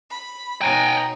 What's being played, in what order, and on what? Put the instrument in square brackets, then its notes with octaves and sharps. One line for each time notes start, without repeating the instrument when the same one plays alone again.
[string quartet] B5
[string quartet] B2 D#4 C#5 [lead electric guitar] G5 G#5 [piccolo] A#5